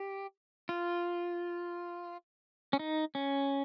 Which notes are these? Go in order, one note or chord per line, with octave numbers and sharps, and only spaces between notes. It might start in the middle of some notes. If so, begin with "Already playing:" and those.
Already playing: G4
F4
C#4
D#4
C#4